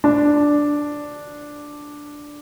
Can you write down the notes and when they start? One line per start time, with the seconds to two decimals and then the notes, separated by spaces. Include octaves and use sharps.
0.04 D4